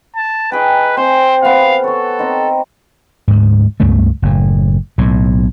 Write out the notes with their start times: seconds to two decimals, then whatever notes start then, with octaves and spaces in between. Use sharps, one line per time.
0.16 A5
0.52 D#4 G#4 B4 G5
0.97 C4 G#4 C5 G#5
1.42 C3 B3 F5
1.84 A4 C#5 A5
2.19 C4 D#4
3.28 D2 G#2
3.80 C#2 G2 C#3 A3
4.22 F#1 A2
4.98 B1 A2